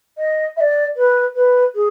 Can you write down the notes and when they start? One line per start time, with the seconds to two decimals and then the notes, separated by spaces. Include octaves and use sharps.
0.17 D#5
0.57 E5
0.60 D5
0.96 B4
1.35 B4
1.75 G#4